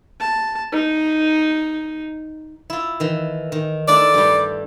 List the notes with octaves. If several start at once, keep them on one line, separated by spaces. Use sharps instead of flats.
A5
D#4
E4 F4
D#3 E3
D#3
A3 D4 E4 D5
G2 G3